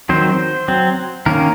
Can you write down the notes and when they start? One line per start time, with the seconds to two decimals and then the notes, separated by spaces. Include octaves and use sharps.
0.09 D#3 F#3 C4 C5
0.68 F#3 C4
1.26 D#3 A#3 C#4 A#4